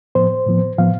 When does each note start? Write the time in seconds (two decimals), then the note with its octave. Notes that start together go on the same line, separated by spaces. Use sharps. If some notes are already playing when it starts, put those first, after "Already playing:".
0.15 A2 F3 B3 C5
0.46 A2 F3 B3
0.78 A2 F3 B3 F5